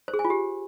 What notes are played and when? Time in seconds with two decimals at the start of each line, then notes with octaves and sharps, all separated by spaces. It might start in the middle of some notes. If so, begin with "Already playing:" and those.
0.08 C5
0.14 G#4
0.19 G#5
0.25 F4
0.30 G4